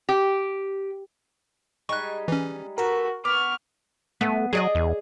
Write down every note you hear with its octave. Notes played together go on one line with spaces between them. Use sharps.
G4
G3 G#3 D#4 C#6 F#6
E3 C#4
A3 F#4 A#4 B4
B3 C#6 D6 F6
A3 B3
F#3 G#4 D5 D#5
E2